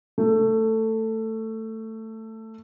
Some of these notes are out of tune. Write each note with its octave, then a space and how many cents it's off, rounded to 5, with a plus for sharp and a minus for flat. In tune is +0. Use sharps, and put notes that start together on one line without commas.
A3 +15